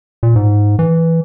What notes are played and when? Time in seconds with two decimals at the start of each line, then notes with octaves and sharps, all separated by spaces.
0.23 A#2
0.36 G#2
0.79 E3